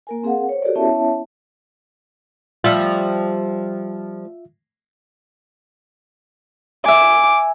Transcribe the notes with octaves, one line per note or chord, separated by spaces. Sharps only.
A#3 A#4 G#5
C4 G#4 A#4 F5 F#5
C5 C#5
F#4 G4 A4 A#4 D5
B3 C#4 E4 C#5 E5 A5
F3 G3 F4 E5
E5 G#5 D6